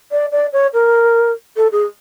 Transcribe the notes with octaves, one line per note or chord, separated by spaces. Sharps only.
D5
D5
C#5
A#4
A4
G#4